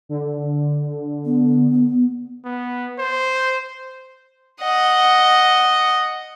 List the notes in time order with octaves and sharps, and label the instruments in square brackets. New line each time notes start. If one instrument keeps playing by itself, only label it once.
[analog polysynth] D3
[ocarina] B3
[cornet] B3
C5
[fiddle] D#5 F#5